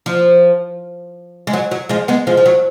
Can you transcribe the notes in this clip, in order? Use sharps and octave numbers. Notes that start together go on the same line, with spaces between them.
F3
G#3
F#3
F#3
F3 G#3
G#3 B3
F3 G#3
F3
F#3